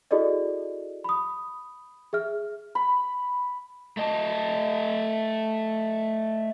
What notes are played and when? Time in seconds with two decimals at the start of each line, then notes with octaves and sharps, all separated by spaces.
0.11 E4 F#4 G#4 A4 D5 D#5
1.04 B5 D#6
2.13 G#4 E5 F6
2.75 B5
3.97 A3 D#5 A5